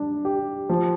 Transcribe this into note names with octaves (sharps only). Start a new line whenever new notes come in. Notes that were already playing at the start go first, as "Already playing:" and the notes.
Already playing: G3 D4
G4
F3